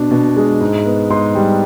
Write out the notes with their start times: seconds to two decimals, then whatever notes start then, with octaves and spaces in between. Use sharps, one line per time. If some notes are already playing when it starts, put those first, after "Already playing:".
Already playing: B2 D4
0.11 B2
0.37 G#3
0.61 G#2
0.86 B3
1.10 G#2 C6
1.35 G3